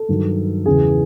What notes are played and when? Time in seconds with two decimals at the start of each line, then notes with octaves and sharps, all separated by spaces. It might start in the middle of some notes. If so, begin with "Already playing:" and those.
Already playing: A4
0.09 G2 D#3 F#3
0.66 E2 C#3 E3 G#4